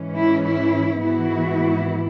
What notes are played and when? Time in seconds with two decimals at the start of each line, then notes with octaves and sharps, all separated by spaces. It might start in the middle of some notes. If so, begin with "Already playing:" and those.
Already playing: G#2 E3 C#4
0.15 E4
0.45 E4
1.03 G#2 E3 B3 E4 F#4